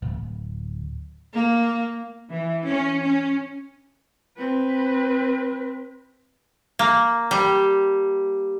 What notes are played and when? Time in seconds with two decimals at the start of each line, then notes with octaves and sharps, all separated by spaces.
0.02 D1
1.34 A#3
2.30 E3
2.68 C#4
3.04 C#4
4.37 C4 B4
6.79 A#3
7.31 G3